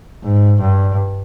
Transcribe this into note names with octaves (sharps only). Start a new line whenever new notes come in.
G#2
G2